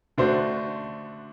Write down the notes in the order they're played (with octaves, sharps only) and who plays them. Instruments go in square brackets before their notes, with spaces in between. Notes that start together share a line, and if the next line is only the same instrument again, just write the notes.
[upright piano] D3 A3 D4 F#4 C5